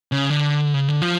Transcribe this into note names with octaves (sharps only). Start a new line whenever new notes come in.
C#3
D3
C#3
D3
F3